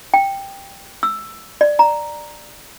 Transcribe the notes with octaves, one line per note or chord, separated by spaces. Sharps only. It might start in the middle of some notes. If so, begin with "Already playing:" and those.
G5
E6
D5
A#5